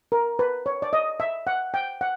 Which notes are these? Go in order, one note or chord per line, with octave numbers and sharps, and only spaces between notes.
A#4
B4
C#5
D5
D#5
E5
F#5
G5
F#5